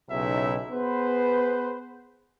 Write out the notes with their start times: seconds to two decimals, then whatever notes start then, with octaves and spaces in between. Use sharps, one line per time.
0.10 B1 C#3 D#4 E4 E5
0.72 B3 G#4 B4 C5